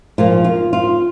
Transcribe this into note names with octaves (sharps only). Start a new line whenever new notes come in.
A#2 F3 A#3 F4
F4
F4